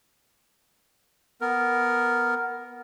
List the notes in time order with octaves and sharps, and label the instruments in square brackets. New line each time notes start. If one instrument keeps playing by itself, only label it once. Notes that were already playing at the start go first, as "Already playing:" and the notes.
[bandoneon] B3 A#4